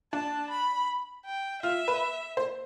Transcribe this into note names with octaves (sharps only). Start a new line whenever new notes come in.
D4 A5
B5
G5
F4 E5
B4
C5